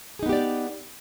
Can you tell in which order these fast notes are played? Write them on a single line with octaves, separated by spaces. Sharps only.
G#4 D#4 B3 G4 D5